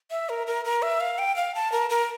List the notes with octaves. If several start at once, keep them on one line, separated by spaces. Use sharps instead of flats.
E5
A#4
A#4
A#4
E5
F5
G5
F5
A5
A#4
A#4